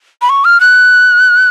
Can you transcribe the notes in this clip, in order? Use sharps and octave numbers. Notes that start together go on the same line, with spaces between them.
B5
C#6
F6
F#6